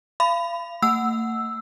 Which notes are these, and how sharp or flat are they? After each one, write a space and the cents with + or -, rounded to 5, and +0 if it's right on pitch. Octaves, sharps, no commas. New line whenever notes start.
F5 -35 B5 +25
A3 +45 F#5 +0 E6 +0